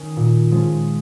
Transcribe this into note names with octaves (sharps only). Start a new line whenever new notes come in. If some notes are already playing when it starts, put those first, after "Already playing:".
Already playing: D#3 C#4
A#2
F3 G#3 C#4